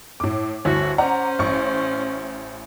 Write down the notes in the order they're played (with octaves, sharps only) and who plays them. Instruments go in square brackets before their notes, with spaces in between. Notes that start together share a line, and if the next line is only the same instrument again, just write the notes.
[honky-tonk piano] A2 D6
[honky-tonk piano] G1 D2 E4 [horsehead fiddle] F#4
[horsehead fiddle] C#4 C5 [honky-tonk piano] D5 F#5 A#5
[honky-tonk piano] A1 C#6